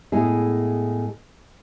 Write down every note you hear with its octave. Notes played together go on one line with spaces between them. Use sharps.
A2 G#3 B3 E4 G#4